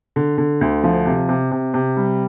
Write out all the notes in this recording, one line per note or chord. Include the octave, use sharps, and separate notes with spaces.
D3
D3
D2
F3
C3
C3
C3
C3
G3